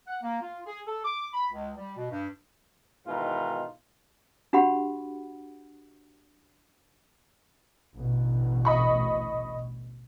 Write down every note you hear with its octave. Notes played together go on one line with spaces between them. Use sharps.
F#5
A#3
F4
G#4
A4
D6
B5
C#2
G3
B2
G2
G#2 B2 D#3 E3 D#4 F4
D4 F#4 G4 F#5 B5
A1 D2 B2
D#5 B5 C#6